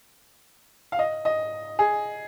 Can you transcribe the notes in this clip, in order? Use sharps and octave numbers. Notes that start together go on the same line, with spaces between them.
F5
D#5
D#5
G#4